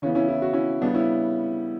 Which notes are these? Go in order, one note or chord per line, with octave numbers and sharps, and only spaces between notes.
C#3 E3 B3 C#4
C#4 E4
E4
F#4
C#4 E4
C#3 G3 B3 D4
C#4 E4